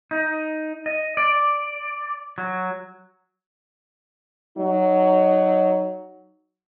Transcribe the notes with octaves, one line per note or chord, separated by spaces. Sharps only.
D#4
D#5
D5
F#3
F#3 D#4